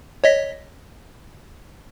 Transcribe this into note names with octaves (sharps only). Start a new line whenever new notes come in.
C#5 D#5 B6